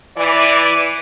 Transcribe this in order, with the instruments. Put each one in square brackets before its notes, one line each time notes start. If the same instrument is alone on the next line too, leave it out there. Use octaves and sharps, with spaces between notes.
[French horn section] E3 D5